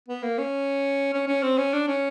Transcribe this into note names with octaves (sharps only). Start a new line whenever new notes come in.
B3
A#3
C#4
C#4
C#4
C4
C#4
D4
C#4